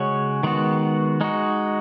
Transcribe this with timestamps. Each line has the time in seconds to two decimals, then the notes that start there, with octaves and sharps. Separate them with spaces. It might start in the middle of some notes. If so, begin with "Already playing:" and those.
Already playing: C#3 G#3 C#4 F#4 C#5
0.43 D#3 G#3 B3 F#4
1.21 G#3 D#4 F#4